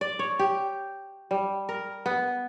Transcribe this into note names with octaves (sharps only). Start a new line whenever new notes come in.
D5
C#5
G4
G3
A#4
B3